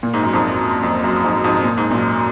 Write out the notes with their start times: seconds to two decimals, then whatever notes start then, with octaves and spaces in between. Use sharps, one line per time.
0.03 A#2
0.14 G#2
0.23 F#2
0.33 F2 G#2
0.83 F2
1.04 F#2
1.24 F2 G#2
1.44 F2 G#2
1.64 A#2
1.78 G#2
1.91 F#2 A#2